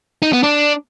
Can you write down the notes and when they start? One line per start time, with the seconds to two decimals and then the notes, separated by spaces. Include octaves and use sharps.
0.22 D#4
0.33 B3
0.44 D4